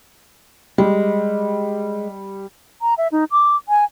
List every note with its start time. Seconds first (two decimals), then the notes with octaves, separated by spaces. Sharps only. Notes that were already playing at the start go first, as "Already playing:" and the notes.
0.78 G3 G#3
2.82 A#5
2.98 E5
3.12 D#4
3.31 D6
3.69 G#5